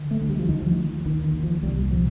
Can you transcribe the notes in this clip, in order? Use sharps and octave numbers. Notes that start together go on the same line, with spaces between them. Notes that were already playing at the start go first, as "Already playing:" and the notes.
Already playing: D3
A3
D2
G3
F3
D#2 D#3
F3
D#2
D#2 D#3
D#3
D#2
F3
C2 G3
A#2 F3